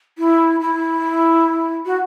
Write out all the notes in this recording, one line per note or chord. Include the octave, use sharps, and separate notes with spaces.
E4
E4
F#4